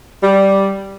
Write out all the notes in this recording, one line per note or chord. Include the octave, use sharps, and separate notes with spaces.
G3